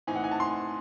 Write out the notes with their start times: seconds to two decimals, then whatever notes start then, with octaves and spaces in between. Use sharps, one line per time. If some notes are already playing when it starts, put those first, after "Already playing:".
0.07 A2 E3 C4 D#4 G#5
0.16 F#5
0.24 G#5
0.31 A5
0.40 C6